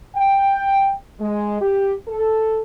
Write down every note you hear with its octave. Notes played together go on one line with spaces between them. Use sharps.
G5
G#3
G4
A4